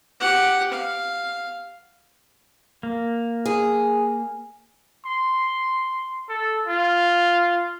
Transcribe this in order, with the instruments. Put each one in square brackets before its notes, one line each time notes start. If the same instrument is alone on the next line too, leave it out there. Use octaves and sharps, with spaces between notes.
[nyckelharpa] G4 F#5
F5
[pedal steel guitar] A#3
[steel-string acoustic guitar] G#4
[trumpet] C6
A4
F4